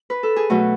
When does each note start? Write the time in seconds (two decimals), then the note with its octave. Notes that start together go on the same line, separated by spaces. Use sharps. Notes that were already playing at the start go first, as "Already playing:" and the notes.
Already playing: C#5
0.10 B4
0.23 A4
0.36 G#4
0.50 B2 F#3 A3 F#4